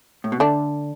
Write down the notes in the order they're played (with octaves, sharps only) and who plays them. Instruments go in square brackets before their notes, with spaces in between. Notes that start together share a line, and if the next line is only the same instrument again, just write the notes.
[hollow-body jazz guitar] A2
B2
[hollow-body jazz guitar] D3 [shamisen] A3 D4